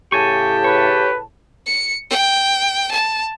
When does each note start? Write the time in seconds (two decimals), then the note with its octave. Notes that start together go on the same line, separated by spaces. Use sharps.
0.12 A2 C#3 G4 G#5 A5 C#6
0.64 B4 C#5
1.67 C#7
2.10 G5
2.91 A5